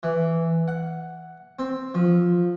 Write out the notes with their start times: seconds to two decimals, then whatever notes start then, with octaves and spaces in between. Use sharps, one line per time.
0.03 E3
0.68 F#5
1.59 C4
1.94 F3